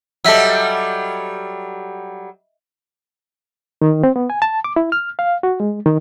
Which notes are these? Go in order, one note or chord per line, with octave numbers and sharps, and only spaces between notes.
F#3 G3 A4 D#5 E5 E6
D#3
C4
B3
G#5
A5
D6
E4
F6
F5
F#4
G#3
D#3